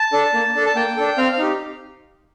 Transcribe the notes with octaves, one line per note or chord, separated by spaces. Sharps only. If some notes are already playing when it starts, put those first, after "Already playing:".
Already playing: A5
D4 A4
A#3
D4 A4
A5
A#3 G5
D4 A4
C4 F5
F5
D#4 G4